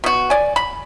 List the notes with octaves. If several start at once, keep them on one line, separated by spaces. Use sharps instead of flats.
B2 F#4
D5 G#5
B5